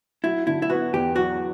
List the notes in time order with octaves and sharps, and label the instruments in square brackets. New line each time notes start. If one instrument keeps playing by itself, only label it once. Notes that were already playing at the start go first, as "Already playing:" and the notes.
[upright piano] F#3 [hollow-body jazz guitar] E4
[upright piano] D3 [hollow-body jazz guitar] E4
[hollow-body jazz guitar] E4
[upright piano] B3 [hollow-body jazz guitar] F#4
[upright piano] E2 [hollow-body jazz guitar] G4
[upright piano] F#3 [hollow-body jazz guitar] F#4